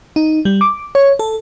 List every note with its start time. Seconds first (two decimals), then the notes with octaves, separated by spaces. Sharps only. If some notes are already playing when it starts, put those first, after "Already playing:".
0.16 D#4
0.45 G3
0.61 D6
0.95 C#5
1.19 A4